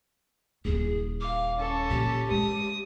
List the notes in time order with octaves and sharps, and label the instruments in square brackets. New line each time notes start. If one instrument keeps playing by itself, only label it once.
[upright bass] D#1 E4 [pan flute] G#4
[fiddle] F5 [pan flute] D6
[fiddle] C#4 A4
[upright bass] A#2 [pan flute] G4
[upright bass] G#3 [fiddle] D#6